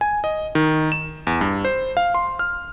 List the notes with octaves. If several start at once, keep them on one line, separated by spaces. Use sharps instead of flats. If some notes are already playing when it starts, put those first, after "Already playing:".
G#5
D#5
D#3
E7
E2
G2
C5
F5
C6
F6